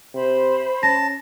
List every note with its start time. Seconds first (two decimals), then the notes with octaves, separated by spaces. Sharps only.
0.14 C3 C5 B5
0.83 C#4 A5 A#6